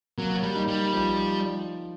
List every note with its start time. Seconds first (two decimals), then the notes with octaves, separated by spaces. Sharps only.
0.18 F#3 A#3
0.43 G3
0.55 D#4
0.68 G3
0.94 F3